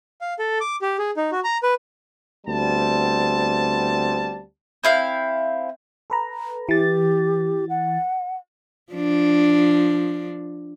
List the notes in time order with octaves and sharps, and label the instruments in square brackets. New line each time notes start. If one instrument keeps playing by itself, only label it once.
[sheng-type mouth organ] F5
A4
D6
G4
G#4
D#4
F#4
A#5
B4
[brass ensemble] D2 G3 B3 C4 A5
[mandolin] C4 E4 F5
[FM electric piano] A4 B4 A#5
[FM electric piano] E3 A6 [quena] G4
[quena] F#5
[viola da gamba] F3 D4